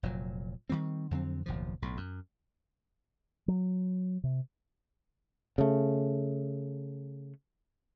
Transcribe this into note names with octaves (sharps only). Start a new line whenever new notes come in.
F1 A#2 F#3
D#3 F#3 G3 C4
F2 D3 F#3 C4
F#1 D#2 B2 F3
B1 A2
F#2
F#3
C3
C#3 A3